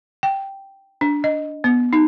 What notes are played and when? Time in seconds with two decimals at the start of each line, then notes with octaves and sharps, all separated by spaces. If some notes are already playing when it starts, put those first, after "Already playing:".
0.23 G5
1.01 D4
1.24 D#5
1.64 B3
1.93 D#4